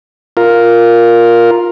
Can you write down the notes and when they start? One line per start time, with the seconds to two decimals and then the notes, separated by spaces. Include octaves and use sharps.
0.37 F4 A#4